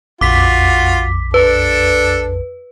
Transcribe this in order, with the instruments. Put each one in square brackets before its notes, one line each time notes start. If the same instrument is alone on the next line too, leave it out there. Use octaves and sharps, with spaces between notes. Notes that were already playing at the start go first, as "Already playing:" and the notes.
[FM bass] A#1 [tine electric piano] F2 [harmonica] F4 F#4 [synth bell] D6 B6
[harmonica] D4 A4 [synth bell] B4